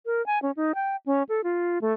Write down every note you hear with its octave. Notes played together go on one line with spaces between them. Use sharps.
A#4
G#5
C#4
D#4
G5
C#4
A4
F4
A3